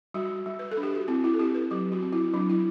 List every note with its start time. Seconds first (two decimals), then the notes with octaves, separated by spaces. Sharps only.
0.14 G3 F#4
0.46 G3
0.59 B4
0.72 A4
0.77 D4
0.83 G4
0.95 F#4
1.08 C4 E4
1.24 E4
1.34 A4
1.39 C4 G4
1.55 B4
1.71 F#3 G4
1.92 F#4
2.03 C4
2.13 E4
2.34 F#3 D4
2.50 E4